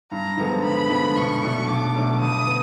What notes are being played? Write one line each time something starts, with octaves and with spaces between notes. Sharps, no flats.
G2 A#5
D3 F3 G#3 B3
G2 B5
D3 F3 G#3 B3
B1 C#6
B2 F#3 A3 D4
B1 D6
B2 F#3 A3 D4
G1 D#6
B3